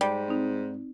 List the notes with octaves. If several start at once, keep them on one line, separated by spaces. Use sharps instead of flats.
G#2 G3
C4 D#4